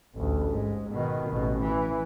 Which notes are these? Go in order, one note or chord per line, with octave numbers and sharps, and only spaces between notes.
A1 D2
G#2
B2 D#3
A1 B2
E3